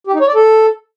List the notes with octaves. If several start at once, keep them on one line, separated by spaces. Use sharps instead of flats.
G4
D#4
C#5
D5
A4